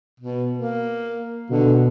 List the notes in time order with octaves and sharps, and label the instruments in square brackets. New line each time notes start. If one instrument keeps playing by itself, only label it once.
[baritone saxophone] B2
A#3
[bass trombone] B2 [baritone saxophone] D3